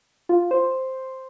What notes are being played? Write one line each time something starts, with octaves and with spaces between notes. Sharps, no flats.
F4
C5